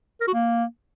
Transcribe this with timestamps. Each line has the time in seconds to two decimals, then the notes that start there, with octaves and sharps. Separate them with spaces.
0.21 A#4
0.27 F#4
0.34 A#3